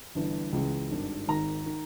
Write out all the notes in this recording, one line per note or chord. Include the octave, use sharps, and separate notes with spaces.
G1 G2 E3
C#2 C#3 E3
G#1 G2 D#3
G#1 G#2 D#3 A#5
D#3